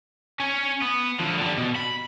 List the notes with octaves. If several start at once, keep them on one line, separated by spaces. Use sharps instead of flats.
C#4 C#5
B3
D3 F3
D3 G3
B2
B5